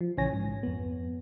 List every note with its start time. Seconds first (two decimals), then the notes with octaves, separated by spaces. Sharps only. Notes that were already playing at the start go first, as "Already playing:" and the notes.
0.01 F3
0.17 A#1 C#3 E3 C#5 G#5 A#6
0.33 G#2
0.63 F2 B3